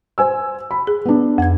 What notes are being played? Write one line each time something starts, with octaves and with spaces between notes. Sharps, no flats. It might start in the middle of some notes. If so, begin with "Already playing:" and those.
C5 G#5 E6
B5
G#4
B3 D4
F2 G#6